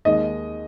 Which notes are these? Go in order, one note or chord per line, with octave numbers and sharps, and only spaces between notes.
D#2 D#3 G#3 D#5